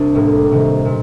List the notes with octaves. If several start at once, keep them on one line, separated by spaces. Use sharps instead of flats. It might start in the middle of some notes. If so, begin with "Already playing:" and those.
Already playing: C2 C4 D4 G4
A1 A2 G3 A#3
C2 C3 D#3
A#2